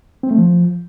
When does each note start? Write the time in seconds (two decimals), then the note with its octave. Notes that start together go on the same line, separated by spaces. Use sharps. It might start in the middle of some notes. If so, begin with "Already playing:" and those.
0.23 C4
0.31 A3
0.38 F3